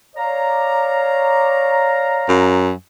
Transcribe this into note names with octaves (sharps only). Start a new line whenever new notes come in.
C#5 D5 F5 A#5
F#2